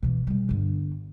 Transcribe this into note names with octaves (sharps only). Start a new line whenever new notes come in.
B2 E3
B2 G3
G1 D3